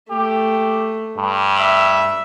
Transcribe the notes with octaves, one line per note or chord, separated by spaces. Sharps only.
A3 G4
G2
E5